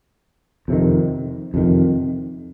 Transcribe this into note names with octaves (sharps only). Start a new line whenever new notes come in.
F2 C3 D#3
F2 C3 D#3